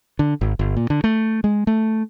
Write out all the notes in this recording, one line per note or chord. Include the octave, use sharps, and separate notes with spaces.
D3
G#1
G1
A#2
D3
A3
G#3
A3